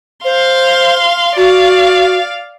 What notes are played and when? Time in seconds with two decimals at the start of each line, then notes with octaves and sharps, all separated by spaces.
0.25 C5 F5 C6
1.37 F#4 D5 F5